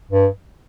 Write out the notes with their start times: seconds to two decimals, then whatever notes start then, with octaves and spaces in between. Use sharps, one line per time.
0.12 G2